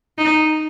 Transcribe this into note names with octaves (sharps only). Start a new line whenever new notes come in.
D#4